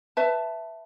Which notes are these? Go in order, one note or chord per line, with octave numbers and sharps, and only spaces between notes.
B4 E5 A5